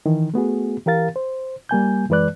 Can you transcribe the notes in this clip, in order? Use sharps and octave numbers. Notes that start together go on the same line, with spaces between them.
D#3 E3
A3 B3 F#4 G#4
E3 G4 A#4 F5 A6
C5
G3 A#3 G#5 G6
F#2 E3 G#3 B4 D5 F#6